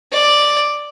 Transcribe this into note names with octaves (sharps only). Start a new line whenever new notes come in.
D5